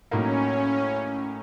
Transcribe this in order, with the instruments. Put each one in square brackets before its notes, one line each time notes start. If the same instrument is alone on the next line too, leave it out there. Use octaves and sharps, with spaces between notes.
[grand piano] A2 F#3 A#3 D#4 [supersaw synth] C#4